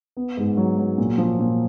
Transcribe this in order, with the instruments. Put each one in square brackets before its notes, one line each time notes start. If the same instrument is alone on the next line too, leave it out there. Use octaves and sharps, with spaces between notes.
[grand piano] B3
G#2
F#3
F#3
A#2
F3
A#2